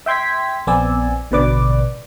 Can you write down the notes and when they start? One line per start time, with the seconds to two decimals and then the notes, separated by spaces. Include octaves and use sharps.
0.06 E5 G5 C6 G#6 B6
0.67 A#1 B3 C4 D5 G#5 E6
1.31 A1 B2 D3 B4 D5 D6